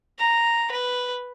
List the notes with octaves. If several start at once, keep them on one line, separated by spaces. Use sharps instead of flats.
A#5
B4